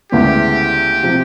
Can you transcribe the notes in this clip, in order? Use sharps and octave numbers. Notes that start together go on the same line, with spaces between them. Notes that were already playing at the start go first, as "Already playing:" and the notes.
D2 C#3 E3 G#3 B3 G4
C3 F3